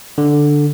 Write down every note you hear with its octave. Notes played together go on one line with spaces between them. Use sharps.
D3